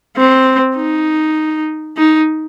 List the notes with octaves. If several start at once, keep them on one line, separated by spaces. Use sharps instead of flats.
C4
D#4
D#4